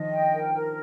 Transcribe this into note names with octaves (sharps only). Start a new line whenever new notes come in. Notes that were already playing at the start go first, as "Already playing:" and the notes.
Already playing: D#3 F3 D#5
G5
A#4
A#4